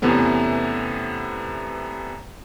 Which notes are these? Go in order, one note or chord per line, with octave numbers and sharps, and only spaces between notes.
E2 C3 E3 A3 B3 C#4